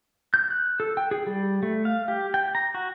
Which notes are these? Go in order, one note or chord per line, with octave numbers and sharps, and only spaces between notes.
G6
F#6
A4
G5
G#4
G3
A3
F5
G4
G5
A#5
F#4